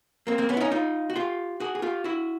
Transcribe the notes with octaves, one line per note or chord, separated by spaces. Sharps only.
A#3 C4
A#3 C4
B3 C#4
E4
C#4 D#4
D#4 F4
F#4
F4 G4
F#4 G#4
G#4
F4 G4
E4 F#4